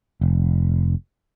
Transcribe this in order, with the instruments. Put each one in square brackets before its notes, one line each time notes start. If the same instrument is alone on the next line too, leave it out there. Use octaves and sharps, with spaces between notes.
[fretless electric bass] F1